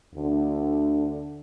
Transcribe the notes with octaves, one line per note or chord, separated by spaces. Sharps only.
D2 D3